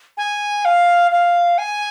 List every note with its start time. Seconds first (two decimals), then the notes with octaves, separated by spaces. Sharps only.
0.18 G#5
0.65 F5
1.12 F5
1.58 G#5